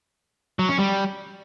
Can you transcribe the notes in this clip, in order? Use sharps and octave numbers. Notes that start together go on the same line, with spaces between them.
F#3
C#4
G3